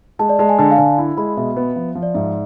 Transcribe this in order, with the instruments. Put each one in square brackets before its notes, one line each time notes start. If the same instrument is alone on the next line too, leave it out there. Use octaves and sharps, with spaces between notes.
[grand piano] G#3 [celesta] A5
[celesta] D5
[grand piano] G#3 [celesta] A5
[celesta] G#5
[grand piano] D3 [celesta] A5
[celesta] F5
[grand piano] D3 [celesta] G#5
[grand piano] E4
[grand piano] G#3 [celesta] B5
[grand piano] B2 [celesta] E5
[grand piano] B3
F3
F3
[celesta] D5
[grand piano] G#2 [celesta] E5